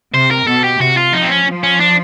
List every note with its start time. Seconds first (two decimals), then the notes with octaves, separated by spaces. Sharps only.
0.14 C3 C5
0.31 A#4
0.47 B2 A4
0.64 G4
0.80 C3 F#4
0.97 F4
1.13 F3 D#4
1.22 C4
1.30 C#4
1.47 F3
1.63 C#4
1.80 D4